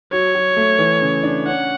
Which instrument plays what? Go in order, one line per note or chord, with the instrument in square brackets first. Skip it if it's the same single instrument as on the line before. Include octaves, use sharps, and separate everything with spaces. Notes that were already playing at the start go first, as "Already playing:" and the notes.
[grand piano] F#3 [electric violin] C#5
[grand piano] F#3
A3
E3
C#3
D4
[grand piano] C#4 [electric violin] F#5